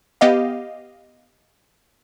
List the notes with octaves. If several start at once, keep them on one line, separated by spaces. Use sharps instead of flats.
B3 G4 D#5 F5